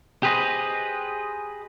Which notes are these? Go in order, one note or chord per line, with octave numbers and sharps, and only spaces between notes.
G4 G#4 B4 C5 D#5